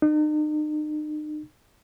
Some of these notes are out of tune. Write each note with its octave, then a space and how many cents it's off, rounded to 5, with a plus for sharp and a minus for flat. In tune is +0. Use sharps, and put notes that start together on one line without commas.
D#4 -40